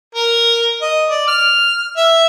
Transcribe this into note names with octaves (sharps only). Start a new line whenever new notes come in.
A#4
D#5
D5
F6
E5